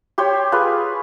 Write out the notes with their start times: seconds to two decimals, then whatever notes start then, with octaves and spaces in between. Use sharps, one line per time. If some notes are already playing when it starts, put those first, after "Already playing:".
0.18 G4 C5 C#5 G5
0.52 F4 G#4 B4